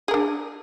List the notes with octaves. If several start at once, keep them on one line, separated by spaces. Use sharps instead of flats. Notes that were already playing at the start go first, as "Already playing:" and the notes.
D4 G#4 A#4